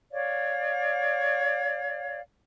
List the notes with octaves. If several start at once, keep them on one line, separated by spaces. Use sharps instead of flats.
C#5 D5 F5